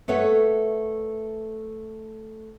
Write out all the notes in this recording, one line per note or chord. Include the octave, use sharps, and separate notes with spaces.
A3 A4 B4 C#5 E5 F#5